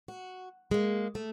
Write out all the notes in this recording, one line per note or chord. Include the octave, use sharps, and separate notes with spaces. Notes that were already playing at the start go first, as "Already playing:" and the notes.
F#4
G#3 A#3
A3